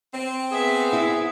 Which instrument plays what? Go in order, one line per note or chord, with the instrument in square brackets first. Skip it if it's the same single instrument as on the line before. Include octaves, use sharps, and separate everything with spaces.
[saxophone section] C4
[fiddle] B3 E5 [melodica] G#4
[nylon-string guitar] E4